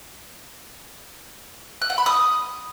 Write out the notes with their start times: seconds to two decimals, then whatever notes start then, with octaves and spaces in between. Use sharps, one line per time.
1.82 F#6
1.90 F#5
1.98 B5
2.06 D#6